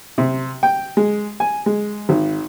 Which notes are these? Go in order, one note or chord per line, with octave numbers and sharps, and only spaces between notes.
C3
G5
G#3
G#5
G#3
G#1